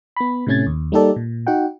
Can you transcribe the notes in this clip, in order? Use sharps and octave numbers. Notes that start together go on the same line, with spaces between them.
B3 B5
A2 C3 A3 C#4 G#6 A6
D#2
G3 A#3 D#4 G4 A4 D5
A#2
D#4 F#4 F#5 G5